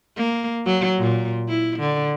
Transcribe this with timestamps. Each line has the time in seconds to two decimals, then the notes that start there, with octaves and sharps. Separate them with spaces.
0.17 A#3
0.66 F#3
0.99 A#2
1.49 E4
1.79 D3